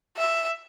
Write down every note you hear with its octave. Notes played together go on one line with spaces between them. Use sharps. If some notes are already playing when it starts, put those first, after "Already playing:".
E5